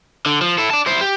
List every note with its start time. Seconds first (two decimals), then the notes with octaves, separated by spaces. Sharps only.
0.26 D3
0.41 F3
0.58 E4 A4
0.71 D5 A5
0.86 E4 C5
1.01 G4